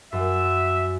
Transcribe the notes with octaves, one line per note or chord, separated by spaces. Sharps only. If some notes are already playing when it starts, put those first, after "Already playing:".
F#2 E5